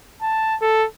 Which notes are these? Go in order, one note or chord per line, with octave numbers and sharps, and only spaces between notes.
A5
A4